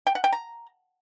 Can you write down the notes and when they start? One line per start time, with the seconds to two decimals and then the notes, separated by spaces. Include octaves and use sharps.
0.07 G5
0.15 F#5
0.24 G5
0.32 A#5